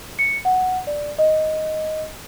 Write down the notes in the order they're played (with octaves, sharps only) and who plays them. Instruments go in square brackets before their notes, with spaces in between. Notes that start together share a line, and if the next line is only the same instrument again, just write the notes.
[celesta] C#7
F#5
D5
D#5